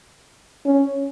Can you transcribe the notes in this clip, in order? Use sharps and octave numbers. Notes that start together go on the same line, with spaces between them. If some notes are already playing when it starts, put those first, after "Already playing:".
C#4